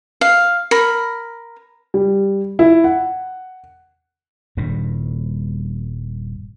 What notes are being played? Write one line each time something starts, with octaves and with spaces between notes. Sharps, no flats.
F5
A#4 B5
G3
E4
F#5
D#1 G2 A#2